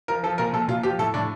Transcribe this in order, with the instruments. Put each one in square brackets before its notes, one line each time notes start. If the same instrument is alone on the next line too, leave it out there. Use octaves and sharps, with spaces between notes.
[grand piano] F3 A#4
F3 A4
A#2 A#4
A#2 A4
A#2 F4
F3 G4
A2 A4
A2 D4